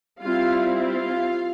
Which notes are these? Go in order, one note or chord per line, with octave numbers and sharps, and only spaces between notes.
G3 C4 E4 F4 F5
F4 F5